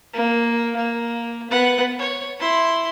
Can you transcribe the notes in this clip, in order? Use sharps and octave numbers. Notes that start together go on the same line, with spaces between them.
A#3
A#3
B3 F#5
C#5
E4 C6